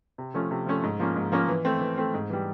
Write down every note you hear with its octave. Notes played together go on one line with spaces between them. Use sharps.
C3
F3 A3 C#4
C3
F3 A3 C#4
G#2
F3 A#3 C#4
G#2
F3 A#3 C#4
E3
A3 C4
E3
A3 C4
G#2
E3 G3